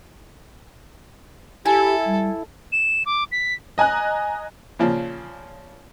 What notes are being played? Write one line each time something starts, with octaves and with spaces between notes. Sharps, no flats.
E4 G4 A4 G#5
G3
E7
D6
B6
D#5 G#5 A#5 F#6
A#2 C#3 F3